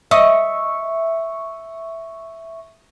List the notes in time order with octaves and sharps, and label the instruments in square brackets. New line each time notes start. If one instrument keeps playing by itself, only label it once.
[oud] D#5 [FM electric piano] E5 C#6